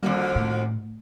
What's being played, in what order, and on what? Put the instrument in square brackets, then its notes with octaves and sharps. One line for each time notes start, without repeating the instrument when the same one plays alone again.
[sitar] F2 D3 D#3 [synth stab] G3 A#3 F#4
[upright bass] A2